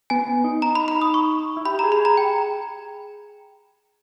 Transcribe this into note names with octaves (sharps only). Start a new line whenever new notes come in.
B3 G#5
D#4
A#5
B5
B5
D#6
C#6
E4
G4 B5
A#5
G#4
B5
G#4
A#5
G5